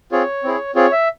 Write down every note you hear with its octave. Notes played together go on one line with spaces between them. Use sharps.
C4 F4 G#4 C#5
C4 E4 G#4
C4 F4 G#4 C#5
E5